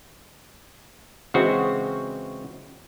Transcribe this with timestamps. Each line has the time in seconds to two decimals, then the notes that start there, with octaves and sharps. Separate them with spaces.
1.34 C#3 E3 G#3 C4 F#4